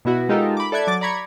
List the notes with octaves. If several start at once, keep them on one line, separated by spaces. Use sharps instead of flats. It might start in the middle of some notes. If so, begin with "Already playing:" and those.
B2 B3 E4 F#4
G#3 D#4 F4 G4 A4 A#4
B5 D6
A4 D5 E5 F#6 G#6
F#3 D6 A6
D5 A#5 B5 C#6 G#6